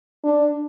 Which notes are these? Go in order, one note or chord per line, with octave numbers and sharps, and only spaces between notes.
D4